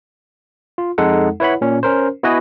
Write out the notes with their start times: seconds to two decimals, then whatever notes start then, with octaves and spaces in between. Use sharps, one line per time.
0.78 F4
0.98 F2 G#3 D#4 A4 F#5
1.40 E4 B4 C#5 F#5 B5
1.61 A#2 C#4
1.83 C#4 A#4 C5
2.23 B3 E4 F#4 B4 D#5 G#5